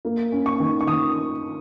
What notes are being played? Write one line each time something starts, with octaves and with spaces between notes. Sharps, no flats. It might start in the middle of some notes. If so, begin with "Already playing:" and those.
A#3
C#4
C#6
D#3
C#6
D#3 D#6